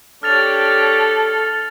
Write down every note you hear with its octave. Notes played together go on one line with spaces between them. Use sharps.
D4 G4 A4 C#5 F6 A6 F7